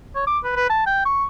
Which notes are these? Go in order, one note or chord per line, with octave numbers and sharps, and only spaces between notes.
C#5
D6
B4
B4
A5
G5
C#6